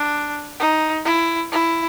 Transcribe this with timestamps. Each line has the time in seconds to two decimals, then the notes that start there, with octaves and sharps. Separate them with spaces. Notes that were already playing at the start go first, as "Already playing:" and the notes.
Already playing: D4
0.60 D#4
1.05 E4
1.52 E4